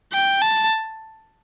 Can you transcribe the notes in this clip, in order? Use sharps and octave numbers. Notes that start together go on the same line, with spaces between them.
G5
A5